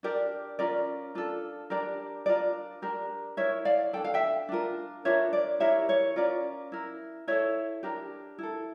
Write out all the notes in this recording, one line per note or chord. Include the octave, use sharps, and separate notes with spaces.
D4 G4 A#4 D5
C#4 F4 A#4 D5
D4 F4 A4
D4 G4 A#4 D5
D4 F4 A#4 D5
D4 G4 A#4
E4 A#4 C#5 E5
D5 F5
D4 A4 G5
F5
E5 G5
D4 F4 A#4
D4 F4 A#4 C#5 E5
D5
E4 G4 A#4 C#5 E5
C#5
C#4 F4 A#4 D5
E4 A#4
E4 A4 C#5 E5
D4 G4 A#4
E4 A4